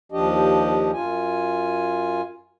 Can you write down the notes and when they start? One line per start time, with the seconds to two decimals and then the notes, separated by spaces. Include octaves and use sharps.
0.12 D#2 F3 D4 G4 D#5
0.93 F#2 F4 G#5